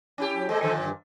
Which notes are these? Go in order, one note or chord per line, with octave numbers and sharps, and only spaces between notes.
C#4 E4 G4
F#3
G#3 A#3 A4 C5 D#5
A#2 D3 F3 A4 C5 G#5
G2